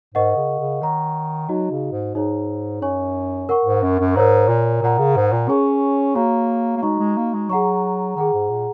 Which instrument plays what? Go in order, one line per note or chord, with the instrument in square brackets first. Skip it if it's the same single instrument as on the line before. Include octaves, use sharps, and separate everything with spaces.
[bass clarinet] G#2 [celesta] A#4 D#5 F#5 C#6
[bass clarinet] C#3
C#3
[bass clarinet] D#3 [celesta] C#5 F#5 A#5 C#6
[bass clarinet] F#3 [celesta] D#4 F#4 D#5
[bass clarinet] C#3
G#2
[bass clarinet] G#2 [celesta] D#4 G#4 C#5 A#5
[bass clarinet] F#2 [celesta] C#5 G#5 C#6
[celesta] A#4 F#5 C#6
[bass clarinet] G#2
F#2
F#2
[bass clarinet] G#2 [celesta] A#4 C#5 A#5
[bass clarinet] A#2
[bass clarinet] A#2 [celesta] A#4 F#5 A#5
[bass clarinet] C#3
G#2
A#2
[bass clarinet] C#4 [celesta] G#4 C#5 G#5 C#6
[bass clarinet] A#3 [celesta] F#4 C#5 A#5 C#6
[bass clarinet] A#3
[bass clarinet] G#3 [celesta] D#4 F#4 D#5 A#5 C#6
[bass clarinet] G#3
A#3
G#3
[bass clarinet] F#3 [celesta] G#4 F#5 A#5 C#6
[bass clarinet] D#3 [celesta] G#4 F#5 A#5
[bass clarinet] G#2
A#2